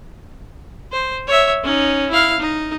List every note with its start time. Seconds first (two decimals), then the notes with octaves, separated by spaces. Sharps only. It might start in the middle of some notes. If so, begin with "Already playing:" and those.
0.92 C5
1.27 C#5 E5
1.63 C#4 D#4
2.09 E4 F5
2.40 D#4